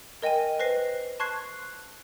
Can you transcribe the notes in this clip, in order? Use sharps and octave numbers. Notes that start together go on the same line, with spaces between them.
A#4 D#5 G5 G#5 D#7
B4 C5 A#6 C7
A5 C6 C#6 F#6 G#6 C7